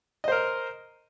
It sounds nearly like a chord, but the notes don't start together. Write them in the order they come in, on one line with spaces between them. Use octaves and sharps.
D#5 C5 A#4